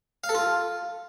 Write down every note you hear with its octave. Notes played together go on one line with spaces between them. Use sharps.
F5
A4
F4